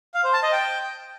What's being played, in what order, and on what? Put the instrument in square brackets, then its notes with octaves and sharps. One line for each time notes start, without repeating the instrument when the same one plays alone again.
[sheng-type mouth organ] F5
C5
A5
D#5
G5